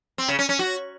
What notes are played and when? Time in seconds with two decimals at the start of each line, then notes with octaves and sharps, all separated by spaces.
0.18 C4
0.28 C#3
0.39 C#4
0.49 C#4
0.59 F#4